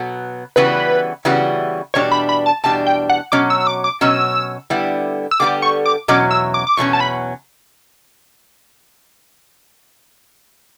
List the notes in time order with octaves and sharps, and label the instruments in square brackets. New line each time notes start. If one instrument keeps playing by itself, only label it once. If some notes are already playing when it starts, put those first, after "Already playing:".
Already playing: [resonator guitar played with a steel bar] B2 F#3 B3
[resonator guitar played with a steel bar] C#3 E3 G3 B3 F#4 [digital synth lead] B4
[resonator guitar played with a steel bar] C#3 E3 G3 B3 F#4
[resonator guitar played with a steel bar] E2 B2 G3 D4 [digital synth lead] C#5
[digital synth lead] B5
B5
A5
[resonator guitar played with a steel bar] E2 B2 G3 D4 [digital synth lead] A5
[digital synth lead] G5
F#5
[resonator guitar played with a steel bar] B2 F#3 C#4 [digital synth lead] D6
[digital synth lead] E6
E6
D6
D6
[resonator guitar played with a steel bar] B2 F#3 C#4 [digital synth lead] E6
[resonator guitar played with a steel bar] D3 G3 B3 E4 G4
[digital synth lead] E6
[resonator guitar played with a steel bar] D3 G3 B3 E4 G4 [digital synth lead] D6
[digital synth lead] C#6
D6
[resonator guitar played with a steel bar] E2 B2 F#3 C#4 [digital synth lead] D6
[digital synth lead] E6
D6
D6
[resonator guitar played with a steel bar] E2 B2 F#3 C#4 [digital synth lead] C#6
[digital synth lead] A5
B5